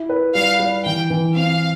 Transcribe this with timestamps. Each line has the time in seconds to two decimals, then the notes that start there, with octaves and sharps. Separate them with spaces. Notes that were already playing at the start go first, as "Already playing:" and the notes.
Already playing: E4
0.09 B4
0.35 G3 F5
0.60 G3
0.85 E3 G5
1.10 E3
1.36 C4 F5